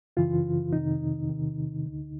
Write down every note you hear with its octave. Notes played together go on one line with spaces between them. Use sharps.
F#2 C#3 E3 F4
F2 C3 D#3 D#4
E2 C3 D#3
D2 D3